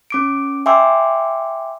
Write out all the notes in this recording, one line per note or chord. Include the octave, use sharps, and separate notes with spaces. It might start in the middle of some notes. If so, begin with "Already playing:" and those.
C#4 D6 D7
E5 G5 G#5 C6 D6 E6